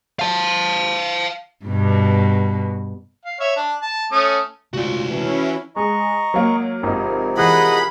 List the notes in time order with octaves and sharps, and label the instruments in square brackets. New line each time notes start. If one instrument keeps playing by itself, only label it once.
[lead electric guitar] F5 A5
[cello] G2 B2
[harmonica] F5
C#5 E5
D4
A5
A3 C#4 D#6
[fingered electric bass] C3 G#3 A3 [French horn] F4 [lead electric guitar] F#4 D5
[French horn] E3 [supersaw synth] C#4 E4
[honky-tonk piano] G#3 [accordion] D#5 A#5 C#6
[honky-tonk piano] F#3 A#3
[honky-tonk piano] G#1 D#5 [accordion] C3 F3 A#4
[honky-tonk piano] E3 F#6 [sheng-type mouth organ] G#4 D#5 F#5 [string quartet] B5